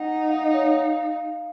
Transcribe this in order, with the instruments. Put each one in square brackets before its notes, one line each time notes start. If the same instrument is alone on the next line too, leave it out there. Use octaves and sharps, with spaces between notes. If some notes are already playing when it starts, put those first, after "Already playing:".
Already playing: [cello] D#4 [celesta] F#5
[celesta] F5
D#5
C#5
F5